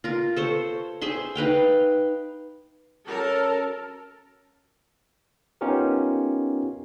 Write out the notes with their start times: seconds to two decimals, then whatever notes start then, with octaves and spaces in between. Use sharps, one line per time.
0.04 F4 A#4
0.36 A4 C5 C#5
1.01 G#4 C5 E5 C6
1.35 D#4 B4 F5 G5
3.07 F#2 A4 A#4 A5
5.61 B3 C#4 D#4 F4 G4 A#4